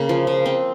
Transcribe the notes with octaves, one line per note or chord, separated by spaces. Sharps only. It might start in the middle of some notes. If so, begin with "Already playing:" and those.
Already playing: C#3 A#3
F3
C#3
C4